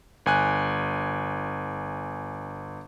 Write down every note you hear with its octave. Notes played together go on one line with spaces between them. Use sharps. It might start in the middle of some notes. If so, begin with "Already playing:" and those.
G1 G#5 F#6